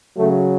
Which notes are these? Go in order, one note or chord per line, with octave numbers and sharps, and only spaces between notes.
C#3 F#3 A3